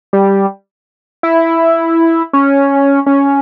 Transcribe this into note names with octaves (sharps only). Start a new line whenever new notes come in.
G3
E4
C#4
C#4